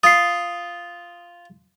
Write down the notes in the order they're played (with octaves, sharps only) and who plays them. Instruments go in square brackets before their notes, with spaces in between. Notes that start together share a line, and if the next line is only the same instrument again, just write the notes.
[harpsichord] F4 [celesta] D#6 C7